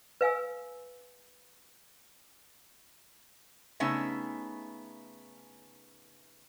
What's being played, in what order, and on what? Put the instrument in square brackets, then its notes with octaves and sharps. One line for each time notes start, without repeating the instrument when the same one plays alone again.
[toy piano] B4 F5 G#5 E6
[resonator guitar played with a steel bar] C#3 A3 B3 C#4 D#4 E5